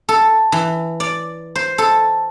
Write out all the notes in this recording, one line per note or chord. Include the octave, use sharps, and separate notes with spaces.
A4
E3
D5
C5
A4